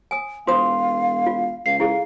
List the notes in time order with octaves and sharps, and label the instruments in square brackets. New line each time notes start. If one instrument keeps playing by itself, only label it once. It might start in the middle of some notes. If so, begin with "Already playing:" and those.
[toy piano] G#5 D#6
[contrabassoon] E1 [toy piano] F4 C5 D#6 [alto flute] F5 [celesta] C6
[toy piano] F4
[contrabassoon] C#2 [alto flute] F5 [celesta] C7
[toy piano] E4 G#4 A4 [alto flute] F5